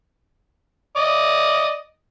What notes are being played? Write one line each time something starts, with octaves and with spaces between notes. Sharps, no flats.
D5 D#5